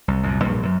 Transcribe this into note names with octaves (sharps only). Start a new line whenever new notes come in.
C2
C2 F#2 A#2
A#1 G2 A#3
F#2 F3 F#3